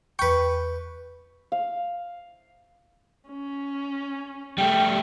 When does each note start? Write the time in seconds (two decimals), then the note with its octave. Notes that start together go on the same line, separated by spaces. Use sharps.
0.19 E2 B4 G5 C#6
1.52 F5
3.29 C#4
4.58 G3 A3 G5